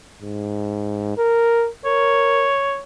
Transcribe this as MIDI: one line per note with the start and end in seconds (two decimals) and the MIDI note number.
0.22 1.16 44
1.17 1.68 70
1.85 2.49 70
1.85 2.80 73